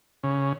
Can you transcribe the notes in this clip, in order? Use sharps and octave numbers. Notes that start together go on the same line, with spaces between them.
C#3